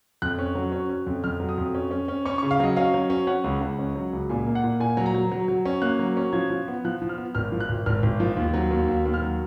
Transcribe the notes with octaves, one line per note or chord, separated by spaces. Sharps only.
F2 F#6
C#4
F#3
C#4
C#4
F2
F2 F6
F#3
D#6
F2
C#4
C#4
C#4
C#4 C#6
C#3 C#6
F5
F#3 D#5
C#4 F5
F#3
C#4
C#4 F#5
C#2
C#2
C#4
F#3
C#2
A#2 G#5
A#3
F#5
A#2
A#2 G#5
F#3
A#5
F#3
F#3
F#3
C#4
A#3 F#6
F#3
C#4
F3 G#6
F3
B3
F3 F#6
F3
F6
B3
G#1 F6
F3
F#6
G#1
G#1 F6
G#1
F3
D#2
F#3
D#2
D#2
D#2
F6
F#3